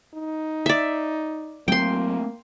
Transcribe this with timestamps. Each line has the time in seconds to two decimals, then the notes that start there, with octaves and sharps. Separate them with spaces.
0.14 D#4
0.66 D5 E5
1.68 F#3 A3 A#3 C4 G5 C6